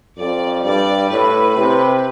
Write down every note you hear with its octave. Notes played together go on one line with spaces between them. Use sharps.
F2 D5
G2 D5
A2 B4
C3